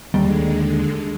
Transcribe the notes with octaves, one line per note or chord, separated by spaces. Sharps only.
D#2 D3 G3 G#3